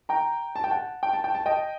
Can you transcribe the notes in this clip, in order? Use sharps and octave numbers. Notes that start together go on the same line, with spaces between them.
G5 A#5
A5
G5
F#5 A5
G5
A5
G5
A5
D#5 G5